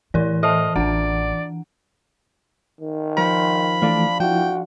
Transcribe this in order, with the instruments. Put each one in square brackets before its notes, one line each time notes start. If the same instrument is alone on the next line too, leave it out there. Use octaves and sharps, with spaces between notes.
[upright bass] A2 [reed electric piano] E3 [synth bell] E4 A#4 D5
[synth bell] A4 E5 A5 [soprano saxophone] D#5
[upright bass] A1 [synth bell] D4 F#5 [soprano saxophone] D5
[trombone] D#3
[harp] F3 [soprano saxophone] B5
[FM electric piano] E3 A3 [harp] D4 D5 F5
[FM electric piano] F3 E4 [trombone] F#4 [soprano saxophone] G5